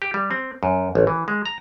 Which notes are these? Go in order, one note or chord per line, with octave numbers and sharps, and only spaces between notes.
G4
G3
C4
F#2
A1
E3
G#3
A#5